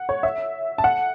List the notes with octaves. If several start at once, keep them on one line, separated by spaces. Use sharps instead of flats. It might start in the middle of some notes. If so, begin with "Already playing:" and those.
Already playing: F#5
C#5
E5
A5
F#5